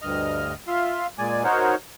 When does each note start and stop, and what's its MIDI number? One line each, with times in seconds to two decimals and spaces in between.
0.02 0.53 38
0.02 0.53 43
0.02 0.53 75
0.02 0.53 89
0.68 1.07 65
0.68 1.07 76
0.68 1.07 77
0.68 1.07 84
1.18 1.43 46
1.18 1.43 56
1.18 1.43 74
1.18 1.43 80
1.44 1.75 63
1.44 1.75 66
1.44 1.75 70
1.44 1.75 72
1.44 1.75 73